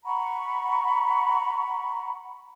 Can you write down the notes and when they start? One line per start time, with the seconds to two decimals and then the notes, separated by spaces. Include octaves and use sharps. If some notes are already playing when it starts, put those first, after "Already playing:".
0.05 F#5 A#5 B5 C#6